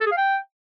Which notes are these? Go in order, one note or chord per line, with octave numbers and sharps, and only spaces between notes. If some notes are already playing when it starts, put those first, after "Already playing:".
A4
G#4
F5
G5